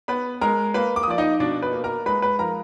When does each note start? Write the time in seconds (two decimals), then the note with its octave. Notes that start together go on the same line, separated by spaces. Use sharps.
0.08 B3 B4 B5
0.41 G#3 A#4 A#5
0.74 A#3 B4 B5
0.96 D6
1.03 D#6
1.07 F3 D5 D6
1.18 D#4 D#5
1.40 B2 D4 D5
1.62 B4
1.73 A#3
1.84 A#4 A#5
2.06 G#3 B4 B5
2.22 B4 B5
2.39 F3 A#4 A#5